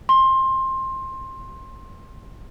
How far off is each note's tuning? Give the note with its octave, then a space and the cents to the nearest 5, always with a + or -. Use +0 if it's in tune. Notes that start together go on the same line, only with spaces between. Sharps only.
C6 +20